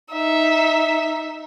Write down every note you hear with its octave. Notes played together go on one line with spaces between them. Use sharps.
D#4 E5